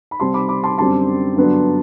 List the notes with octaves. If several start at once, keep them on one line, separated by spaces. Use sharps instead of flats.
B5
C3 G3 C4 A5 C6
B5 D6
B5 D6
A5 C6
F#2 D3 G3 C4 A5 C6
G2 D3 F#3 B3 D4